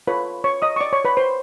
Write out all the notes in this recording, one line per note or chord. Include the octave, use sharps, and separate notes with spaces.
F4 A4 B4 C#5 B5
C#5 C#6
D#5 D#6
C#6
D5 D6
C#5 C#6
B4 B5
C5 C6